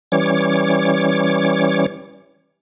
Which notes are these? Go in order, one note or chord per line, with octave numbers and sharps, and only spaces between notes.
E3 G3 C#4 C#5 D6